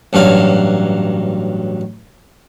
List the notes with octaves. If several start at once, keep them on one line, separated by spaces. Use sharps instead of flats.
A1 G2 F#3 F5